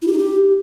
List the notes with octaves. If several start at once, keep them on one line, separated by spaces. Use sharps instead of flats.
E4
G4
D#4
G4